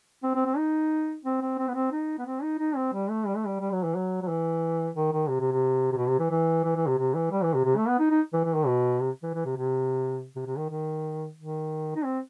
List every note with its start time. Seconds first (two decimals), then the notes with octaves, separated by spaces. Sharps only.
0.23 C4
0.35 C4
0.46 C4
0.57 D#4
1.25 C4
1.41 C4
1.58 C4
1.68 B3
1.75 C4
1.92 D#4
2.19 B3
2.26 C4
2.43 D#4
2.59 D#4
2.76 C4
2.93 G3
3.10 A3
3.27 G3
3.37 A3
3.46 G3
3.60 G3
3.72 F#3
3.84 E3
3.95 F#3
4.22 F#3
4.28 E3
4.96 D#3
5.13 D#3
5.29 C3
5.40 C3
5.52 C3
5.93 C3
5.97 B2
6.08 C3
6.19 E3
6.31 E3
6.65 E3
6.76 E3
6.87 C3
6.98 C3
7.15 E3
7.32 G3
7.43 E3
7.54 C3
7.65 C3
7.77 A3
7.88 B3
7.99 D#4
8.11 D#4
8.33 E3
8.44 E3
8.56 D#3
8.67 B2
9.00 C3
9.23 E3
9.34 E3
9.46 C3
9.57 C3
10.36 C3
10.46 C3
10.58 D#3
10.70 D#3
11.37 D#3
11.96 D#4
12.05 C4